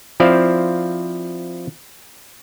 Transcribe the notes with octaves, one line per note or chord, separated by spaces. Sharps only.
F3 C4 E4 C5 D5 F5